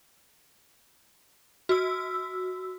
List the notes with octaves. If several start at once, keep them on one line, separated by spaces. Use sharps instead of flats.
F#4 E6